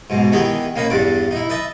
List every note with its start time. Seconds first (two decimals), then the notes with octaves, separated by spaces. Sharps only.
0.10 G#2 B2
0.32 D#3 E3 B3 G4 G#4
0.76 A#3 C#4 D#4 B4
0.90 E2 G2 D4 D6
1.31 D#4 E4
1.49 B4 D#5 E5 A5